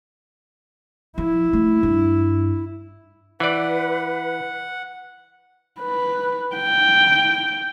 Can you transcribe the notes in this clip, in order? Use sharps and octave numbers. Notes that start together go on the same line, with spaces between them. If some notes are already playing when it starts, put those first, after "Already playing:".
F3 E4
A3
G2
E3 B4 D5 F#5
B4
G5